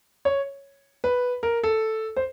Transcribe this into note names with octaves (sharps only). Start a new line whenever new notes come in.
C#5
B4
A#4
A4
C5